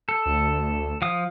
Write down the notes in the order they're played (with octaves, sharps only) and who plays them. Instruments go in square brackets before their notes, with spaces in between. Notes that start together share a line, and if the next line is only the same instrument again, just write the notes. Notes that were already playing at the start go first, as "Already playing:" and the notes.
[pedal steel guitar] A4
[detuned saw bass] D2
[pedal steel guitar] F3 F5 D#6